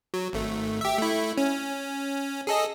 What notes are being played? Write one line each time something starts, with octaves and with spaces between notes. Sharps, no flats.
F#3
G#1 A3
G4 E5
A3 E4
C#4
G#4 A4 D#5